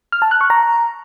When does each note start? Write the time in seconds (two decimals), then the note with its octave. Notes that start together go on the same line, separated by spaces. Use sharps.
0.12 F6
0.22 A5
0.31 F#6
0.41 C#6
0.50 A#5